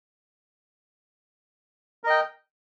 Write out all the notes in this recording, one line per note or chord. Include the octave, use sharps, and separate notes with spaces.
A#4 D#5 G5